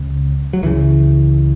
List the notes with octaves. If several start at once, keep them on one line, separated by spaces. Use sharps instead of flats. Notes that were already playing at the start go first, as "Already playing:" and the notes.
Already playing: C#2 C#3
F#3
C#2 C#3 E3